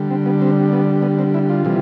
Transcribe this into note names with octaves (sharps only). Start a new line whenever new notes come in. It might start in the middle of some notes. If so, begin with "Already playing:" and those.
Already playing: D3 G3
C4
B3
C4
B3
B3
C4
E4
F4
C3 E3 G3